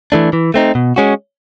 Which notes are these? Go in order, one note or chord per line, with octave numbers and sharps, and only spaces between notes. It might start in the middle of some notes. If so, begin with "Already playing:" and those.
E3 A3 D4
E3
A3 C4 D#4
B2
G#3 C#4 F#4